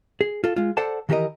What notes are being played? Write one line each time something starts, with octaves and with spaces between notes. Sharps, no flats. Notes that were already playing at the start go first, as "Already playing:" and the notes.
G#4
F4 A4
G#3 F4
A4 C5 D5 F#5 A5
D#3 E3 F#4 G4 A#4 D#5